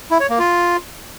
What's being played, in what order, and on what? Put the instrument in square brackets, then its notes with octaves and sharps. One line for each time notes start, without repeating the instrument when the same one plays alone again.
[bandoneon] E4
C#5
A#3
F4